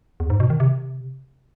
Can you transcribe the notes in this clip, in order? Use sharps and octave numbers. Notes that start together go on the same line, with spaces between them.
E2
G#2
B2
D#3
C3